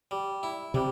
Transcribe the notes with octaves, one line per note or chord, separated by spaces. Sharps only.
G3
E4
C3 G3